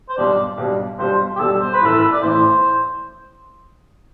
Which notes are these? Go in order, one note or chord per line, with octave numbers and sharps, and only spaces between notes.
C5
B1 B2 G3 D4 D5
B1 B2 G3 D4
B1 B2 G3 D4 C5
G4
B1 B2 G3 D4 A4
C5
B4
A1 A2 E3 A4
B4
D5
A1 A2 E3 C5